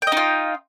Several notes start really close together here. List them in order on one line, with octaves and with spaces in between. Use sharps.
G5 D#5 D#4 F4